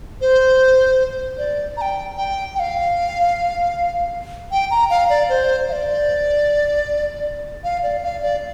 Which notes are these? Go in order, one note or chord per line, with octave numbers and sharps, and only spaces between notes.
C5
D5
A#5
G5
G5
G5
F5
G5
A#5
F5
D5
C5
F5
D5
F5
D5
F5
D5